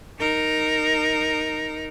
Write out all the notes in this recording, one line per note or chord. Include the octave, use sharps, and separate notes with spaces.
D#4 A#4